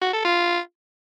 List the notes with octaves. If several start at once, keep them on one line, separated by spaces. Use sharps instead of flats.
F#4
A4
F4